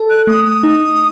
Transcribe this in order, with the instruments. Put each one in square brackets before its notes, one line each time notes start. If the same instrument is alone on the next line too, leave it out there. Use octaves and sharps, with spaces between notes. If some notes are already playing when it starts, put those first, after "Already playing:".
Already playing: [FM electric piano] A4
[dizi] F#6
[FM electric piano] A3 [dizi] D#6
[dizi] D#6
[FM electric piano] D#4